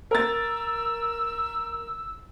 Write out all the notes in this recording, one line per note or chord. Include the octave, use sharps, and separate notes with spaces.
A#4 E6 A6